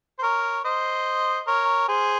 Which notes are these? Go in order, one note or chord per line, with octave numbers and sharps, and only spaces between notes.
C5
A#4 C#5
C5 D#5
A#4 C#5
G#4 C5